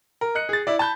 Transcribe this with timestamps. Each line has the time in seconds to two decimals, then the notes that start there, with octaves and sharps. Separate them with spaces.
0.21 A#4
0.35 D#5 F#6 C#7
0.49 G#4 A6
0.67 E4 D5
0.79 A5 B5 G6